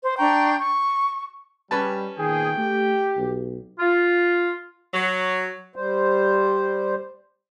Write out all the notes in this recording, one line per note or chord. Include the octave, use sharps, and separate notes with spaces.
C5
D4 G5 A#5 C#6
C#6
G3 C#4 B4 A5
A#2 D#3 B3 G#4 G5
A3 G4
B1
F4
F#3
G3 C5